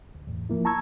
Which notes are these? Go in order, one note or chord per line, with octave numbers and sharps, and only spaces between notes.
D2
E2 A2
F3 A#3 E4
A5 A#5 C#6 E6 G#6